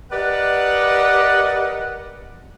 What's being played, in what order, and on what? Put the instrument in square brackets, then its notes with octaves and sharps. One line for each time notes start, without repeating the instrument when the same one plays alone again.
[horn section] G4 A#4 B4 D5 D#5 F#5